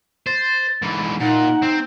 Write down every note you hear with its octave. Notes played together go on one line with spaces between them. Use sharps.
C5 A6
G#2 E3
A#2 D#4 F#5
C4